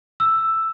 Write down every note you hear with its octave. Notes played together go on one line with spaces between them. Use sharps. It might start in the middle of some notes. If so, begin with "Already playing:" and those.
E6